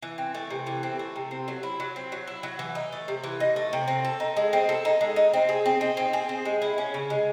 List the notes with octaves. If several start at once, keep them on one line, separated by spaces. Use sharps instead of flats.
E3
C4
A3
C3
E3
C4
A3
C3
C4
F#3
E4
F#3
C4
F#3
E4
F#3
E3
D#4
A3
C3
E3
D#4
A3
C3
C4
A4
D#4
G#3
C4
A4
D#4
G#3
D#4
C4
G#4
C4
D#4
C4
G#4
C4
G#3
E4
C#4
C#3
G#3